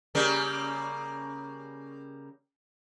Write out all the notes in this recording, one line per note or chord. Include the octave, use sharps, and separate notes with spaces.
C#3 G3 A#3